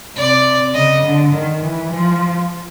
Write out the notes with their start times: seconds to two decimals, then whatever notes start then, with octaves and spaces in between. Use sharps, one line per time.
0.16 C3 D5
0.74 C#3 D#5
1.04 D3
1.33 D#3
1.62 E3
1.91 F3